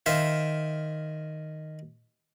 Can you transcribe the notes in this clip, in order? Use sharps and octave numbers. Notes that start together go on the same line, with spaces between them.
D#3 C5 E5 F5